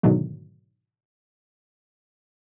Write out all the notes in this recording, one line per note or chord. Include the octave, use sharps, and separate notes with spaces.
G#2 B2 D3 D#3 F#3 A3